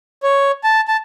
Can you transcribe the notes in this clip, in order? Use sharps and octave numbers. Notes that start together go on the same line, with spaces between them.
C#5
A5
A5